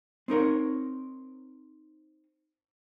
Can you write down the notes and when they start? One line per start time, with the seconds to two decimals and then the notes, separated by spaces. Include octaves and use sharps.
0.28 C4 D#4 A#4 C#5